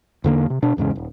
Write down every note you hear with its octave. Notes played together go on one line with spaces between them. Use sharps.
E2 D3 A#3
C3
B2 D4
D1 E2 G#2 C#3
D#1